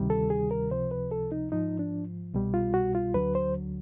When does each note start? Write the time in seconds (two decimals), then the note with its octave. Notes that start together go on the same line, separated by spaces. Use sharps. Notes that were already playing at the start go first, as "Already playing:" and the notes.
Already playing: D2 C3 D#3 G3
0.10 A4
0.30 G#4
0.51 A#4
0.71 C#2 C3 F3 C5
0.91 B4
1.11 A4
1.32 D#4
1.52 G#2 F3 D#4
1.79 D4
2.34 C2 B2 G3
2.54 F4
2.74 F#4
2.95 F4
3.14 D2 D3 F#3 B4
3.35 C5